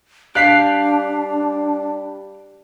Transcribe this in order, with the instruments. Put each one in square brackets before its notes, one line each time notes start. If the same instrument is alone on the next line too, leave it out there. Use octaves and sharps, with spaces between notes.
[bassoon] G3 [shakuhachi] D4 [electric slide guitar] G4 D5 F5 [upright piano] F#6 B6 C7